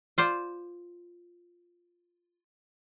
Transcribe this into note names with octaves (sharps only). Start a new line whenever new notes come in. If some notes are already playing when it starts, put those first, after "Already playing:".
F4 C5 D5